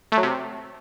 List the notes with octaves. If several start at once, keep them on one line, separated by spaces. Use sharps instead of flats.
A3
F#3
C3